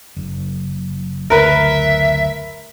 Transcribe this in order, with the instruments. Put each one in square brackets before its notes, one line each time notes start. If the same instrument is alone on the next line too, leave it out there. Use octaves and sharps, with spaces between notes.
[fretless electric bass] F#1
[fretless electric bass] F#1 D2 [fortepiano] A#4 B4 [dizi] E5